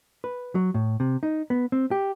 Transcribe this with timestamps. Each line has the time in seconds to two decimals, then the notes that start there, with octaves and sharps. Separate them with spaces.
0.24 B4
0.55 F#3
0.74 A2
1.00 C3
1.23 D#4
1.50 B3
1.72 C4
1.91 G4